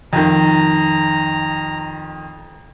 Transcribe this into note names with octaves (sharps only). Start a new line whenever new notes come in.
F2 D#3 A#5